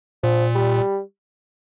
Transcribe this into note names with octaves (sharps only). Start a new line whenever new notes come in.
A#2 F3
G3